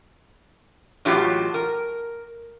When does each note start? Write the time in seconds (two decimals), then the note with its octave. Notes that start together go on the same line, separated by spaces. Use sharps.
1.05 A2 E3 F#3 G#3 F4 G4
1.54 A#4